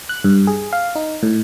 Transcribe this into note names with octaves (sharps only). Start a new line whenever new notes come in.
F#6
G2
G#4
F5
D#4
A2